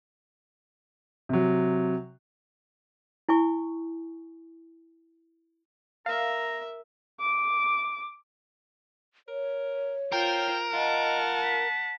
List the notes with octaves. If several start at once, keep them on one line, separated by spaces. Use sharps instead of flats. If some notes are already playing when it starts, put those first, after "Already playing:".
C3 F#3
E4 G#5 C#6
A#4 E5 F5 A#5
D6
A#4 C#5
F4 A#4 C5 G5
F4 D#5 F#5 A5
B6